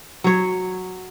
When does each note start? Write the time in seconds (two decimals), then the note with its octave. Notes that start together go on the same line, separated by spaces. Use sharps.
0.24 F#3 C#5